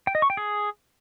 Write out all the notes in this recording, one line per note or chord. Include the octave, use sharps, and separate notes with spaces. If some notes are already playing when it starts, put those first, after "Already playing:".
G5
D#5
C#6
G5
G#4